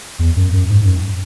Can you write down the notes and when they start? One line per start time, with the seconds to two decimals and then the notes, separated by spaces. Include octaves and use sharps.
0.19 E2
0.36 F#2
0.53 F#2
0.69 G#2
0.85 F#2